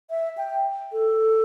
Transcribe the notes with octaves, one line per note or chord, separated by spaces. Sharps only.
E5
G5
A4